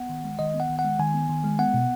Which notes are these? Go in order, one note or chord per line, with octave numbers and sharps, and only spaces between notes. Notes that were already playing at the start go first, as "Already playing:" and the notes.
Already playing: B3 F#5
D#3
G#3
D#3 D#5
B3
F#5
D#3
F#5
G#3
D#3 G#5
B3
D#3
G#3
B3 F#5
B2